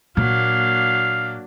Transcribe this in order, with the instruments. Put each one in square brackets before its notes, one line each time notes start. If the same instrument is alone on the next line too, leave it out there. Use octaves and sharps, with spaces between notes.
[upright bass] A#2 [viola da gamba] F#3 A#3 D4 [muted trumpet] F5